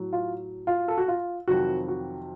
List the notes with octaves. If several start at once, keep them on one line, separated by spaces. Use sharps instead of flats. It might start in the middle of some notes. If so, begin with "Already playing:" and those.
Already playing: A2 F#3
F4
F4
A4
F#4
F4
F2 C3 D#3 F#3 F#4
F#4